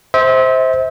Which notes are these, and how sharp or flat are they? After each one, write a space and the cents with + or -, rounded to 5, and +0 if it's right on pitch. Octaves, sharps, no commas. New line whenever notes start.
C5 +0 E5 -35